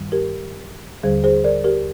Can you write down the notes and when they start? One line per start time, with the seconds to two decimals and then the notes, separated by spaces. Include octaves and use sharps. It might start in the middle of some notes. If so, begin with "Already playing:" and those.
Already playing: G2 D#3 G3
0.12 G4 A#4
1.03 D#2 D3 G3 G#4 C5
1.24 G#4 C5
1.44 A#4 D5
1.64 G4 A#4